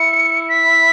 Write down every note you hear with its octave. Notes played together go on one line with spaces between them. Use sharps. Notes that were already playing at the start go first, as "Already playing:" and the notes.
Already playing: E4 C#7
B6